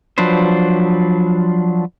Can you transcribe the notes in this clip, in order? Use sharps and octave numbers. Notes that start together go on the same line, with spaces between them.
F3 F#3 D4 B4 C5